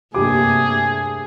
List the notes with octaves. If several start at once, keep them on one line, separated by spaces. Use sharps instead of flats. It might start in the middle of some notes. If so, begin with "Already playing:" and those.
G2 C3 A3 A#3 G4 G#4 D6